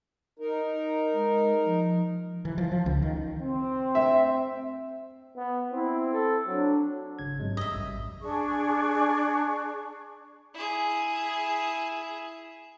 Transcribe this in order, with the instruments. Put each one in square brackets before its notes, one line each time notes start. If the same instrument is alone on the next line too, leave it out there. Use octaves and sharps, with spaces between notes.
[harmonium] D#4 A#4
[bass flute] G#3
F3
[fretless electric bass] E3
F3
F3
C#2
D#3
[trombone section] C4
[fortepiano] E5
[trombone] B3
[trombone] C4 [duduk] E4
[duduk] A4
[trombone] F#3 [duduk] D4
[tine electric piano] G#1 C#3 G#6
[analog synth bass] G#2 [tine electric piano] C3 F#3 G#3
[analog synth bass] F#2 [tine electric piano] G3 [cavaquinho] D#5 E5
[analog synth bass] A1
[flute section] D4 G#4 C#6
[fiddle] E4 G#4